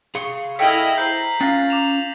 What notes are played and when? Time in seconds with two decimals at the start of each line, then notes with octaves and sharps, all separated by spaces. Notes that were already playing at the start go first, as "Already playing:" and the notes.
0.15 G#4 F5 C6 C#6
0.59 E4 A4 D#5 G5 G#5 F6 B6 F#7
0.98 C5 A#5 G6 C7 F#7
1.41 C#4 F4 F#6 A6 A#6
1.70 D6 E7 F7